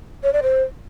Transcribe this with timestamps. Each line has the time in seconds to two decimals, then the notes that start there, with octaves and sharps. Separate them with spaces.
0.23 C#5
0.33 D5
0.43 C5